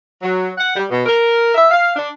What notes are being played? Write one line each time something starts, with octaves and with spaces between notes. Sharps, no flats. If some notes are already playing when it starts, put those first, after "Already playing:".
F#3
F#5
G3
B2
A#4
E5
F5
D4